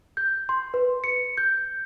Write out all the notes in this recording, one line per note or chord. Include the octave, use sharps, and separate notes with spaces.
G6
C6
B4
C#7
G6